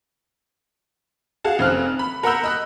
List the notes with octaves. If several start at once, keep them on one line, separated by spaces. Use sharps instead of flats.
F#4 G#4 F5 F#5 A5
F1 C4 F6 F#6
B5
A#4 F#5 A#5 B5 E6 G6
D#5 B5 F#6